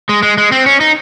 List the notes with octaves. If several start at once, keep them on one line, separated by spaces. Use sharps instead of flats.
G#3
G#3
G#3
C4
C#4
D#4